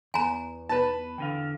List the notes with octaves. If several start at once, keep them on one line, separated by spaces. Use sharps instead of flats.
E2 B3 G#5 A#5
B4 A5
E2 D3 F5 G5